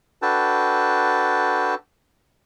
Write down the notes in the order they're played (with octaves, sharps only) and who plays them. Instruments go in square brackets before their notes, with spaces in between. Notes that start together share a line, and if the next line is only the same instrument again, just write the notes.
[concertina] D4 F#4 A4 B4 G5 A5